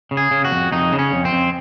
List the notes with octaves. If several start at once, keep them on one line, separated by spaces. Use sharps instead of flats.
C#3
G#4
C#3
F#4
F2
F2 D#4
C#3
C#4
F2
C4
F2